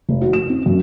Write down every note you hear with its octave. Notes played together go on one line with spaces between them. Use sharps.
F1
F#4
E7
C4
F#2